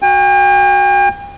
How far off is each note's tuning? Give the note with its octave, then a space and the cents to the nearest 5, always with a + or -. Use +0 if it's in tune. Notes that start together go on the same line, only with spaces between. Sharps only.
F#4 +0 G5 +45